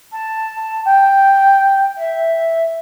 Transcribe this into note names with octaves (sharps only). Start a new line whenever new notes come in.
A5
G5
E5